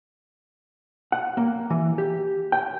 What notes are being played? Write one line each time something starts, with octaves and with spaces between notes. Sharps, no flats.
F#5
A#3
E3
G4
G5